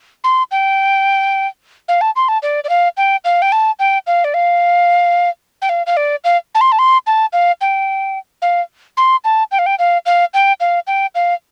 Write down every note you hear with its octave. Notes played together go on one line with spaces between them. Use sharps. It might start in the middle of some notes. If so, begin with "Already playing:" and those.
C6
G5
F5
A5
C6
A5
D5
D5
F5
G5
F5
G5
A5
G5
F5
D5
F5
G5
F5
F5
D5
F5
A5
C6
A5
C6
A5
F5
G5
F5
C6
A5
G5
F5
G5
F5
F5
G5
F5
G5
F5